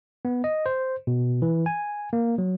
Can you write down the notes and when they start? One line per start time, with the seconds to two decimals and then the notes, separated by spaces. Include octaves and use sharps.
0.25 B3
0.44 D#5
0.66 C5
1.07 B2
1.42 E3
1.66 G#5
2.13 A#3
2.38 F#3